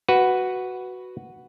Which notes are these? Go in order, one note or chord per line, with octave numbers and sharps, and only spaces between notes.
F#4 B4